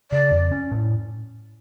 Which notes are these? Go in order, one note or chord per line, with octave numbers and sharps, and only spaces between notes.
C#3 D5
F2
C#4
A2